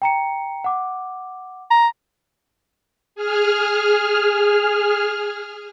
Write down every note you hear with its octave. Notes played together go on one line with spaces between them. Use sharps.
G5 A#5 C#7
F#5 D6
A#5
G#4 F6